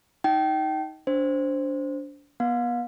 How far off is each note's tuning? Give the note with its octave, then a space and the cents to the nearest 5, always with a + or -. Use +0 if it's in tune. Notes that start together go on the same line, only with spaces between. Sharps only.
D#4 +15 G5 -25
D4 -25 C5 +0
B3 -30 F5 +40